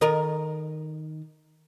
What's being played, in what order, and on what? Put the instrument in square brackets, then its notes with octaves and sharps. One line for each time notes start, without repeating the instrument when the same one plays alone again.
[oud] D#3 A#4 D#5